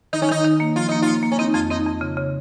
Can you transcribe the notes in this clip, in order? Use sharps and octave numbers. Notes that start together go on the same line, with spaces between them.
D#3 D#4
C#4
D#3 D#4
D#3
A#3
F3 F4
A#3 D#4
A#3 F4
A#3
C#4
C4 D#4
F2 F4
C4 D#4
F2
C#3
C#3